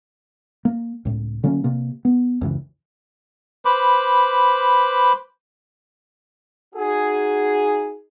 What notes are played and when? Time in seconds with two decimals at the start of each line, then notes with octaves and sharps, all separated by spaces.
0.65 A#3
1.05 C#2 A2
1.43 D3 F#3 A#3 C#4
1.64 C3 A#3
2.05 B3
2.41 C#2 F#2 C#3 E3
3.65 B4 C5 B5 D6
6.75 D#4 F#4 G#4